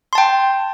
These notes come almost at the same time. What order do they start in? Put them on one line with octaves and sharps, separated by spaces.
C6 A5 G5